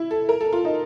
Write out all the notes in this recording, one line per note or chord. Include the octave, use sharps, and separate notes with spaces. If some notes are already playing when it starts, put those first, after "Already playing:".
Already playing: E4
A4
A#4
A4
F4
D#4